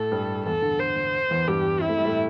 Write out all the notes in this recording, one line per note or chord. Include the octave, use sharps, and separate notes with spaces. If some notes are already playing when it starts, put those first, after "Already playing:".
Already playing: A2 A3 A4
G2 G3
E2 E3 A4
D3
C5
D3
E2 E3
G2 G3 G4
C4 E4
A3
G3
A2 A3